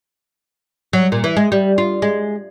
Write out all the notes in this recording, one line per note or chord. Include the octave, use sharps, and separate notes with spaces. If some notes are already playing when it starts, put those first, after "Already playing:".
F#3
A#2
E3
G#3
G3
F4
G#3